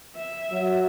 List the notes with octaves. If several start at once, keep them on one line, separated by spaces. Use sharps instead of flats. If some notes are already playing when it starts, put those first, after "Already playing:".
E5
F#3